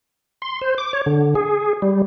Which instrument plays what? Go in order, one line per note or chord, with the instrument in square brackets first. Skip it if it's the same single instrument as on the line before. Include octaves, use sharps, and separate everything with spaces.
[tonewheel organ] C6
C5
D6
C#5
D3
G#4
G3